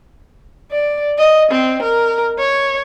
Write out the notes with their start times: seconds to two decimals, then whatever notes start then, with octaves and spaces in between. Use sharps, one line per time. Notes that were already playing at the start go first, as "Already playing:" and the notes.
0.72 D5
1.19 D#5
1.52 C4
1.83 A#4
2.39 C#5